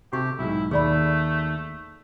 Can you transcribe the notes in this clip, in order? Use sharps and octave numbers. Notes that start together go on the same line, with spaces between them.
C3 F#4 G4 A4 C#6
B1 G#2 E4
D#2 A3 G#4 D5 B5